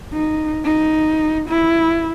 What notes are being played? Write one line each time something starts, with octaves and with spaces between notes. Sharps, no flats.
D#4
D#4
E4